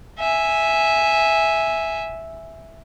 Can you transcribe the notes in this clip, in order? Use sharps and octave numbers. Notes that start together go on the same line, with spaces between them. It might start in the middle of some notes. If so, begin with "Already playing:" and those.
E5 G#5